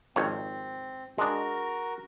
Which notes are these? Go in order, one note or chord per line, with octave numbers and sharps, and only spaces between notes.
G#1 F2 C4 C#5
G#3 D4 F#4 A#4